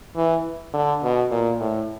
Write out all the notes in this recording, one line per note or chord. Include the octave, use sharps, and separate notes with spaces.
E3
D3
B2
A#2
A2